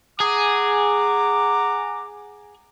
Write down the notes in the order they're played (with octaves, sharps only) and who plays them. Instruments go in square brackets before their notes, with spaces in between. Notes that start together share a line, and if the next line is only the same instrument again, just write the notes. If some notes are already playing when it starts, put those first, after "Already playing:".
[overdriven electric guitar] G#4 [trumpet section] F#5 A#5 D6